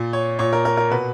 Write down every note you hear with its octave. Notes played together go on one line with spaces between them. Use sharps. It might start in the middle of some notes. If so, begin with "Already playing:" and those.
Already playing: A#2
C#5
A#2 C#5
A#4
A#4
A#4
B2 B4